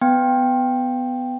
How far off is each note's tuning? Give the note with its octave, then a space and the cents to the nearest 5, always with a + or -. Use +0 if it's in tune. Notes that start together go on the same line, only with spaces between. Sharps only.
B3 +20 G5 +0